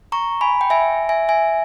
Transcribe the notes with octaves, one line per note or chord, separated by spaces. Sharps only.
A#5 C#6
G#5 B5
G5
E5 G#5
E5 G#5
E5 G#5